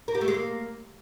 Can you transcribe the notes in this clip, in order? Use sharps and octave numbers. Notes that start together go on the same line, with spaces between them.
A#4
G4
A3
G#3
A#3